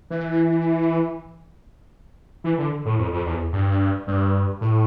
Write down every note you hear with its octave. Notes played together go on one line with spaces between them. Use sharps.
E3
E3
D3
A2
F2
F2
E2
G2
G2
A2